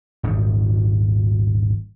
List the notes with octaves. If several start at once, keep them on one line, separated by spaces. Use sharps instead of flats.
D#1 G#1 G#2